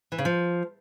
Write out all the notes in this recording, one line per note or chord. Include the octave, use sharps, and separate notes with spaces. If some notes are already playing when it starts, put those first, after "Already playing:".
E3
C#3
F3